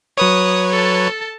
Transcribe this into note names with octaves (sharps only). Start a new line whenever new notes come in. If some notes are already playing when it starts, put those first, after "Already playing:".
F#3 B4 C#5 D#6
A4 A5